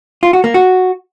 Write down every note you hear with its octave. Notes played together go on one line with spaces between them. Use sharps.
F4
F#4
A#3
F#4